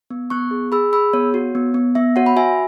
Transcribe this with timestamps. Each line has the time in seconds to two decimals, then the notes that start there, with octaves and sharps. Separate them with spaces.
0.10 B3
0.30 B3 C#6 F#6
0.51 G#4
0.72 G#4 B5 E6
0.93 G#4 B5 E6
1.13 B3 C#5
1.34 F#4
1.55 B3
1.74 B3
1.95 B3 E5
2.16 F#4 C#5 F#5
2.26 B5
2.36 F#4 E5 G#5